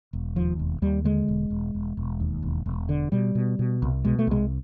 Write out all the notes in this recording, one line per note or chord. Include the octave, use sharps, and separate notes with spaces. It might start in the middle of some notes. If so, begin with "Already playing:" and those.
E1
D#2 F3
E1
D#2 G3
D3 G#3
E1
E1
E1
E1
D#2
E1
E1
D3
B2 G3
B2
B2
C2
B2 G#3
A3
C2 G#3